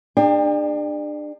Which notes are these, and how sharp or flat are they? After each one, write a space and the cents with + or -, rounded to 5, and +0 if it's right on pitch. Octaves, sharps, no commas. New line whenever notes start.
D4 +30 G#4 -40 G5 +30